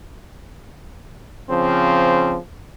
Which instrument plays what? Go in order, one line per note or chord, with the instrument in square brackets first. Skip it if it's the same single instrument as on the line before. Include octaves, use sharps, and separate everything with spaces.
[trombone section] C#3 F3 C4